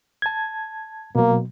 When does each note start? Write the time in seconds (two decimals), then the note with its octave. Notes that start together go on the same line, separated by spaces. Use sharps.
0.22 A5 G#6
1.15 B2 F#3 A#3